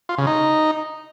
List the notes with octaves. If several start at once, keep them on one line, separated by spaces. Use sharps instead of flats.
F4
C#3
D#4